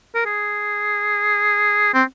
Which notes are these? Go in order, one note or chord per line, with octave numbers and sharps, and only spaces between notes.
A#4
G#4
C4